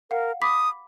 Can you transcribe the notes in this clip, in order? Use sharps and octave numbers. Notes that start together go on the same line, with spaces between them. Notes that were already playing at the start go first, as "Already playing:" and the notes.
A#4 F5 F#5
B5 D6 D#6 B6